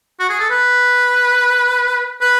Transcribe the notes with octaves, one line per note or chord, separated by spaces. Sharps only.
F#4
G#4
A4
B4
B4